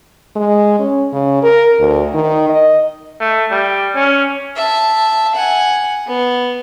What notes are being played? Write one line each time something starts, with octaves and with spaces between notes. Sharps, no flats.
G#3
C#4
C#3
A#4
D2
D#3
D#5
A3
G3
C#4
E5 A5
F#5 G#5
B3